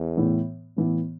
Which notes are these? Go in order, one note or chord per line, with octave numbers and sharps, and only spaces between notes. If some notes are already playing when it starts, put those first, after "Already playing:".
Already playing: E2
A2 E3 B3
A2 E3 B3